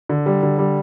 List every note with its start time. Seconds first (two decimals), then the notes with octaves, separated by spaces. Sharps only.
0.09 D3
0.26 G3
0.43 D3
0.58 G3